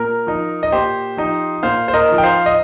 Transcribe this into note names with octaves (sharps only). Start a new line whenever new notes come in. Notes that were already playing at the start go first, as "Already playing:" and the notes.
Already playing: A#2 A#4
F3 D#4
D#5
A#2 G4 C5
F3 D#4
A#2 C5 F5
C5
A#4 D#5
F3 D#4
G5
C5 F5
D#5